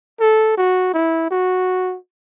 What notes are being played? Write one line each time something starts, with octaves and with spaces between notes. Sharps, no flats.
A4
F#4
E4
F#4